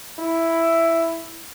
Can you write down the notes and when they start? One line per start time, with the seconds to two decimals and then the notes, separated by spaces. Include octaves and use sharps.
0.19 E4